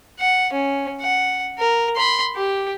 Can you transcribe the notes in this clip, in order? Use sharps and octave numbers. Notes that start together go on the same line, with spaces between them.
F#5
C#4
F#5
A#4
B5 C6
G4